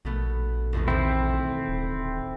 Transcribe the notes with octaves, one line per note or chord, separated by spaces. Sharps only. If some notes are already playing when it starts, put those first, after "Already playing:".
A#1 B2 A3 B3
F1 E2 B2
D#1 A2 C4 E4
D1